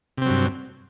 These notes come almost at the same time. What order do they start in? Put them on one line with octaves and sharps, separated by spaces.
C3 C4 F#3 G2